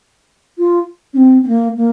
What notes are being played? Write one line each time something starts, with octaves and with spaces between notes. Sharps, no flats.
F4
C#4
C4
C4
A#3
A#3